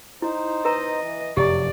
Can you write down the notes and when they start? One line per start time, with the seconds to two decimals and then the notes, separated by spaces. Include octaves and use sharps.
0.22 D#4 E4 C5
0.65 B4 D#5 A#5
1.01 E3
1.37 F1 F#2 F#3 G4 D5